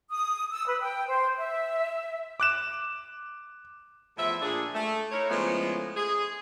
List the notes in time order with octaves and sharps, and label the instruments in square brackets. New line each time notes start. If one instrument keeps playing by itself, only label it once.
[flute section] D#6
E6
B4
G5
C5
E5
[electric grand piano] D6 F#6 E7
[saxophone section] E2 A2 F3 E5
A#2 D4 G#4
A3
D#4 E4 A#4 C#5
A2 C#3 F3 G#3 A3 B3
G#4